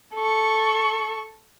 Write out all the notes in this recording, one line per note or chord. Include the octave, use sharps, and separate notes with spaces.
A4 C#6